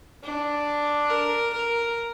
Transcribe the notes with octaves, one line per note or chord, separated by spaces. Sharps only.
D4
A#4
A#4